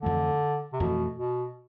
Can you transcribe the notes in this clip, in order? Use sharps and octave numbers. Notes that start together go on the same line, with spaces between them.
F2 D3 E3 A3
C3
F2 B2 E3 A3
B2